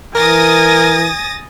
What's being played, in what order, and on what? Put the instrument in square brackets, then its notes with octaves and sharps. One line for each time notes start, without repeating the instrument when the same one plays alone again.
[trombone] E3 [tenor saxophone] A#4 [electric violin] G#5 [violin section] D#6 A6 A#6